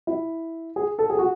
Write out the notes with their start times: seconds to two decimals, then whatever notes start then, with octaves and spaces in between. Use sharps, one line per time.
0.07 E4
0.76 G#4
0.99 A4
1.10 G#4
1.19 F#4